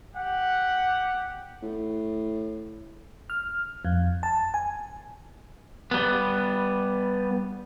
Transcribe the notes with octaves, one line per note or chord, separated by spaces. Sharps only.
G4 F#5
A2
F6
F2
A5
G#5
G3 B3